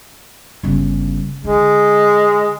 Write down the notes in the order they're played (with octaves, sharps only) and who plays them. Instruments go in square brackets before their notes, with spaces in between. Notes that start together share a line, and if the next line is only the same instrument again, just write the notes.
[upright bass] G1 C#3
[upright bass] D3 [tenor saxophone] G#3